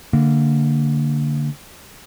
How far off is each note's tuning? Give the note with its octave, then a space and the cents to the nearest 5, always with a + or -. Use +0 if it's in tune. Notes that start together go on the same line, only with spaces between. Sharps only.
D3 -10 A#3 -25